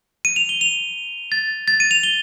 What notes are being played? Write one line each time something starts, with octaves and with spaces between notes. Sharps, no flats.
D#7
F7
G7
F7
A6
A6
D#7
F7
G7